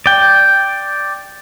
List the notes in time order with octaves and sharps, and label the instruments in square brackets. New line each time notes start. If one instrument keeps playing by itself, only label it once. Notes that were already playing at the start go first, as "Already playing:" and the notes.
[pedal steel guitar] D5 G5